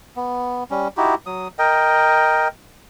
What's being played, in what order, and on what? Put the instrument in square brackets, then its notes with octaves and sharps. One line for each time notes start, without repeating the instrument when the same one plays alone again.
[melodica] B3
G3 C#4
D#4 E4 F#4 G4
F#3 D#6
A#4 D#5 G5